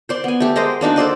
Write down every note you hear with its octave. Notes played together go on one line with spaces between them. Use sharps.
C5 D5 C6
B3 G#5
A3 G4
G#3 A#4 C5 D#5
A#3 D4 D#4 F#4
A4 C5 D5 D#5